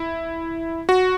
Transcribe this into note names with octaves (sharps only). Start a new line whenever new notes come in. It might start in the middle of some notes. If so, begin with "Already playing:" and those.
Already playing: E4
F#4